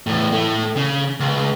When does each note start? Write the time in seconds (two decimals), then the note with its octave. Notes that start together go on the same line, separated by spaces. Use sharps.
0.07 E2 A2
0.32 A2 A3
0.77 C#3
1.20 C#2